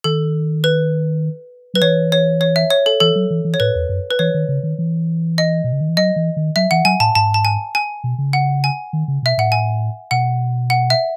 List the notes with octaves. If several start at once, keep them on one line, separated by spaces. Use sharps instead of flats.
D#3 A4
B4
F#3 B4
E3 C#5
C#5
C#5
E5
C#5
A4
E3 A4
F#3
E3
E3
C#5
A2 B4
E2
F#2
B4
E3 C#5
D#3
C#3
D#3
E3
D#5
B2
C#3
D#3
E3
F#3 D#5
E3
D#3
F#3 E5
E3 F#5
F#3 G#5
A2 A5
G#2 A5
A5
G#5
G#5
B2
C#3
F#5
G#5
D#3
C#3
B2 E5
A2 F#5
G#5
B2 F#5
F#5
E5